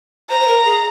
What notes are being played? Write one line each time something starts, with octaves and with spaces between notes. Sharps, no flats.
C5 A#5
C5
A#4
G#4